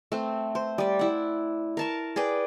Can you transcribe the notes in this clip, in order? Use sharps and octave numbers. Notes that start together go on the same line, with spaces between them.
A3 C4
C5
G3 D5
E4 F#5
A#4 A5 C#6
G#4 B4 D5 G5